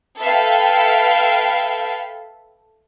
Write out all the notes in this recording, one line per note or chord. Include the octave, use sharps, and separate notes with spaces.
A4 B4 E5 F5 G5